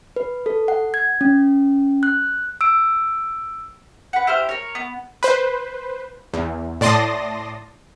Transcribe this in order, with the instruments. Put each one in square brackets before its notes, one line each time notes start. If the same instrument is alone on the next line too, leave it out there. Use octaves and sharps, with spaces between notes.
[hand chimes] B4
A4
F#5
G#6
C#4
F#6
E6 D7
[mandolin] B4 F#5
E4 G4 C5 F6
A#4 C#5
B3
[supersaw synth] B4 C5
E2
A2 D5 A5 C6 D#6 A#6